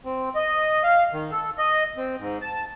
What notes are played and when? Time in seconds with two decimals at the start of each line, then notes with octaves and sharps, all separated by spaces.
0.05 C4
0.35 D#5
0.83 F5
1.13 D#3
1.31 A4
1.58 D#5
1.97 C4
2.19 G#2
2.41 A5